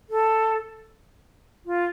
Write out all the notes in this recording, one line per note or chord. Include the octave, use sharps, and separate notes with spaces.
A4
F4